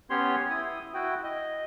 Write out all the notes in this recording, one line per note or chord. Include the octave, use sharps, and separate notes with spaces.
B3 C#4 G4 C#5 C6
E4 D#6
E4 F#4 G5
D#5